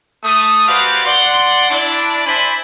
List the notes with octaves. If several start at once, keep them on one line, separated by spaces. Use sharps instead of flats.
A3 D#6
F#4 G4 B4 C5 D5 F5
D5 F#5 C6
D4 E4 D5
C5 D5 E5 G#5 B5